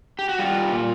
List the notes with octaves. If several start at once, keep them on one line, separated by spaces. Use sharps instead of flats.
G4
F#4
G3 F4
A#2